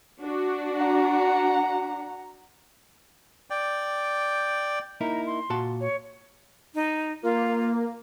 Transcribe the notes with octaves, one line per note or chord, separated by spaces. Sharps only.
D4 F#4
F#5 A#5
D5 G5
A#3 D#4 E4 A#5
C6
A#2 F#4 A5
C#5
D#4
A#3 F4